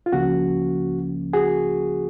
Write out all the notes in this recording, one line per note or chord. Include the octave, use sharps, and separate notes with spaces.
F4
C#2 C#3 F3 A#3 C#4 F#4
F#4 G#4